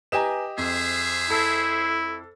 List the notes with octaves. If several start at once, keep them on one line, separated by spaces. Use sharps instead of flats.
G4 B4 D#5 G#5 A#5 E7
F2 G#4 C5 E5
E4 A4